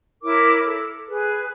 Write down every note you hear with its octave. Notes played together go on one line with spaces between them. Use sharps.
E4 A#4 C#5 D6
A4
G#4 B4